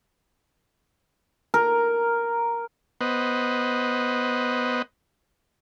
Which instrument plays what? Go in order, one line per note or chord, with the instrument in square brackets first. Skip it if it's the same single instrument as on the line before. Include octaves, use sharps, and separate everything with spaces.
[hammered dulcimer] A#4
[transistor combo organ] B3 B4 C5 D#5